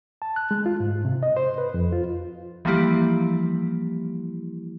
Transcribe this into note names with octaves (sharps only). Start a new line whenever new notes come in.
A5
F#6
G#3
F4
G#2
C3
D#5
C5
B4
F2
F4
E3 F3 G3 A#3 E4 G4